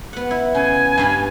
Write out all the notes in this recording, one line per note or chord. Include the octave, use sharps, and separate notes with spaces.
B3 F#5
E4
C#3 G#5
G2 F5 B5